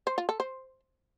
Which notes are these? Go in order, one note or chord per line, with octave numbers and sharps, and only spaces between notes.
C5
F4
A4
C5